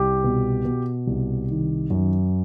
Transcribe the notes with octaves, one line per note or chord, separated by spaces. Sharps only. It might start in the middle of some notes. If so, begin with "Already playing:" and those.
Already playing: C2 G4
B2
B2
C2
D#3
F#2